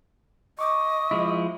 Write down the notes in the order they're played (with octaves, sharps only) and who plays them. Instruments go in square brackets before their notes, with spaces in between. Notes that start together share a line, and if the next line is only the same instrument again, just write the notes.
[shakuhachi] D#5 [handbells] C#6 D6
[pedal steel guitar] F3 G#3 E4